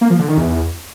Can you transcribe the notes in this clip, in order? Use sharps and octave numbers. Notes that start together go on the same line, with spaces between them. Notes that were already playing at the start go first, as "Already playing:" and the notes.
A#3
F3
D3
D#3
E2